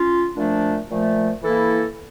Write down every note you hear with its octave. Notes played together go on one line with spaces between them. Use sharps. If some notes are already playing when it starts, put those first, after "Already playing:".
Already playing: C#4 F4
A#2 F3 A3 D4
A#2 F3 A3
E3 A#3 E4 A4